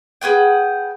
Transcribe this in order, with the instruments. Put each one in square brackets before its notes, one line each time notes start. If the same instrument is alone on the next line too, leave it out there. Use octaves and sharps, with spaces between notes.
[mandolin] G#4 B4 F#5 G5